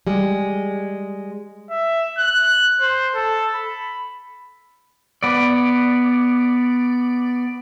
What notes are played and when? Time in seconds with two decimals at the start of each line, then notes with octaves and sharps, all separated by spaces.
0.07 G3 G#3
1.70 E5
2.18 F#6
2.81 C5
3.15 A4
3.54 B5
5.23 B3 D5